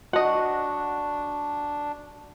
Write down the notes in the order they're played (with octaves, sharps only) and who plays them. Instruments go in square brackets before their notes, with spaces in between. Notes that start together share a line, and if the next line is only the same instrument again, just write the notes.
[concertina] D4 [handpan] F#4 [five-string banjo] D#5 F#5